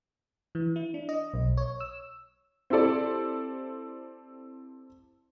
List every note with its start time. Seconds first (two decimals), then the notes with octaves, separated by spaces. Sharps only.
0.55 E3
0.76 E4
0.94 D4
1.09 D#5
1.34 B1
1.57 C#5
1.80 E6
2.70 C4 E4 G4 A4 D5